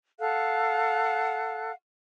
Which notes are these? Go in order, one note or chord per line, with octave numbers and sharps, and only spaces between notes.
A4 F5 F#5 F#6